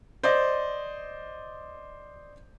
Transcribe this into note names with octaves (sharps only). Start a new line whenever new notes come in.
C5 D5 D#5